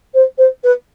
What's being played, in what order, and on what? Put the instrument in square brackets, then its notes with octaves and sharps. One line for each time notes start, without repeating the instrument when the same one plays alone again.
[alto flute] C5
C5
B4